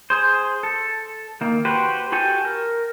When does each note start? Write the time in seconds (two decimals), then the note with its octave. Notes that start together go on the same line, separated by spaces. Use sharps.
0.10 G#4 C5
0.63 A4
1.41 D#3 A#3
1.65 F#4 G4 B4 C5
2.12 F#4 G4 A4 G#5
2.45 A#4